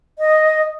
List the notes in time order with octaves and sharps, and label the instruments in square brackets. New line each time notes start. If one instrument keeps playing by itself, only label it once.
[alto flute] D#5